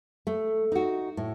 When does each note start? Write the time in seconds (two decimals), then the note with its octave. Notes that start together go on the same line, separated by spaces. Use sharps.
0.27 A3
0.72 D#4 F#4
1.17 A2